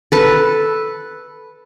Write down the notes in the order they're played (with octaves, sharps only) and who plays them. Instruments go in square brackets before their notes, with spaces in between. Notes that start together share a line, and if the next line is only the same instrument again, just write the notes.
[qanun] A4 B4